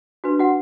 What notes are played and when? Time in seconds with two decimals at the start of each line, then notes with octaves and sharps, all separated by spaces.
0.24 D4 F#4 B4
0.39 F#4 F#5